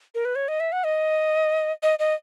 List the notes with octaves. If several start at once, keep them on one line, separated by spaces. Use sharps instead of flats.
A#4
B4
C#5
D#5
E5
F#5
D#5
D#5
D#5